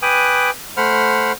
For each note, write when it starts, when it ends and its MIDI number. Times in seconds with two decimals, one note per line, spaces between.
0.02 0.50 71
0.02 0.50 79
0.02 0.50 80
0.02 0.50 86
0.02 0.50 87
0.02 0.50 90
0.77 1.32 57
0.77 1.32 72
0.77 1.32 78
0.77 1.32 83
0.77 1.32 89